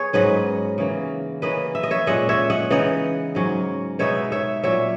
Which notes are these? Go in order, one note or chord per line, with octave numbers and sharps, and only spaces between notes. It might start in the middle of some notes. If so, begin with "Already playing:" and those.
Already playing: B3 G#4 C#5
G#2 F#3 C#4 B4 D#5
C#3 E3 A#3
E3 A#3 C#4 B4 D#5
E5
D#5
C#5 E5
A#2 G#3 C#4 D#5 F#5
C#5 E5
D#5 F#5
C#3 E3 B3 D#4 D#5 F#5
G#2 F#3 C#4
B2 G#3 B3 D#4 C#5 E5
C#5 E5
A#2 F#3 C#4 C#5 E5